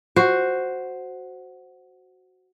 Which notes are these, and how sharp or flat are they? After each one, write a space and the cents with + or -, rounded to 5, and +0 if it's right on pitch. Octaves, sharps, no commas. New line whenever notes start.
F#4 +0 C5 +0